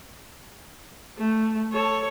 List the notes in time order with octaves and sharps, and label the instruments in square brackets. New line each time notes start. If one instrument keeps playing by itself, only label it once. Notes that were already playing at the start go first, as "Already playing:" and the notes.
[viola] A3
A4 C#5